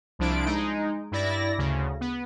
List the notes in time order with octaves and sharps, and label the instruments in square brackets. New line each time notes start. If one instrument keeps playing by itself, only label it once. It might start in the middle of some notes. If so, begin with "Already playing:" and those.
[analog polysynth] C2 F3 D4 E4 D7
G#3 D#4
G2 E4 D5 A#6
D2 C#3
B3